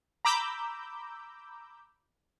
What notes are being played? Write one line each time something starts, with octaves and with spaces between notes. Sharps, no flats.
A#5 B5 D6 E6 G6